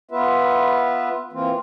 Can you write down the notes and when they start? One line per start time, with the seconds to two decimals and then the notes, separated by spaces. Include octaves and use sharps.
0.11 B3 F4 B4 E5
1.32 E3 A#3 C4 F4